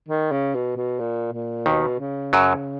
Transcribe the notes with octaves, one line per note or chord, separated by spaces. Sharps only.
D#3
C#3
B2
B2
A#2
A#2
D#2 B2 D#3
C#3
F#2 F#3